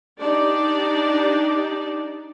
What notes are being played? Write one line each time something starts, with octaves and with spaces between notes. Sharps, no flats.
D4 D#4 G4 D5